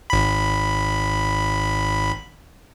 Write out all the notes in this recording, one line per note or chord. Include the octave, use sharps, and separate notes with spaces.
G#1 B5